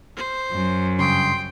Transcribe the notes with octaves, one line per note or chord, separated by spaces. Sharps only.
C5
F#2
G2 C#3 G5 C6